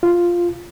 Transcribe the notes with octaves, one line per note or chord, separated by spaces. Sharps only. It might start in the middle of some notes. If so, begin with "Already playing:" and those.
F4